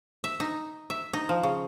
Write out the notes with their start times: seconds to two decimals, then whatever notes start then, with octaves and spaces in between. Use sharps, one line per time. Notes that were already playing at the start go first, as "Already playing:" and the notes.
0.24 E5
0.40 D#4
0.90 E5
1.13 D#4
1.29 F3
1.43 C#3